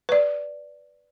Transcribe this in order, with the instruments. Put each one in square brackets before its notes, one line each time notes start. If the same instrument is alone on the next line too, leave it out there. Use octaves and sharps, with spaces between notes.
[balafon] B4 D5